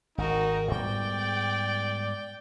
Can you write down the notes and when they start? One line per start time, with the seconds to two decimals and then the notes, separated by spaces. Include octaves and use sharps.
0.18 G#1 D#4 F#4 A#4
0.71 G#2 G3 B3 D5 G5